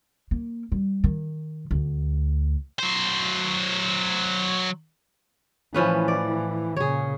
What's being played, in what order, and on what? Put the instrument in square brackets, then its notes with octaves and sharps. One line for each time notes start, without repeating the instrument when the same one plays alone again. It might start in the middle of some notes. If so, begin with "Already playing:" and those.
[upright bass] A#3
G3
D#3
D2
[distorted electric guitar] F#3 C5
[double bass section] A2 E3 [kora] F3 C#4 B4
[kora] D5
[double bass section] A#2 C#3 [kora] G#4 C#5